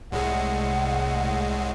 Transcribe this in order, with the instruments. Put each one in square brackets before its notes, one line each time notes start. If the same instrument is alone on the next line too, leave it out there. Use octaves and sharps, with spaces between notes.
[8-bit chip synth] C2 A2 G#3 [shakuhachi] F#5